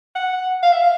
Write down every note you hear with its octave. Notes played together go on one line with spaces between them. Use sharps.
F#5
F5
E5
F5